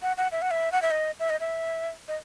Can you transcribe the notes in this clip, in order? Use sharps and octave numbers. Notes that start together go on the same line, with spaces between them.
F#5
F#5
E5
F#5
E5
F#5
E5
D#5
E5
D#5
E5
D#5